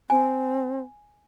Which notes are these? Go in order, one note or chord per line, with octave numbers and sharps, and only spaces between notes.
C4 G#5